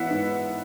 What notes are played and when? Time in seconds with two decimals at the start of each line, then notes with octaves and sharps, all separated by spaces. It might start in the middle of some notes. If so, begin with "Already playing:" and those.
Already playing: E3 B3 E4 E5 F#5
0.10 G#2